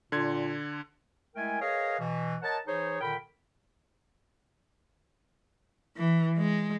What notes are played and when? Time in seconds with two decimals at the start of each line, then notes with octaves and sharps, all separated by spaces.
0.12 A#2 D3 C6 G#6
1.35 G#3 A3 E4 A#4 G5 G#5
1.61 G#4 A#4 B4 C#5 D#5 F5
2.00 B2 E3
2.42 A#4 C#5 D#5 F#5 A5
2.66 E3 D#4 G#4 C5 C#5
3.01 A#2 D3 D#3 A#4 G5 B5
5.97 E3
6.37 G#3